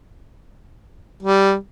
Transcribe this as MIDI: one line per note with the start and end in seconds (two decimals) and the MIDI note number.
1.23 1.54 55